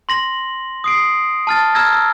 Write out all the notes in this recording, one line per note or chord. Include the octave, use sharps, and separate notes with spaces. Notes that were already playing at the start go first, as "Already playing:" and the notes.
C6 A#6 F#7
D#6 C7 D7
A5 F6 A6
A#5 E6 F6 G#6 A#6
E6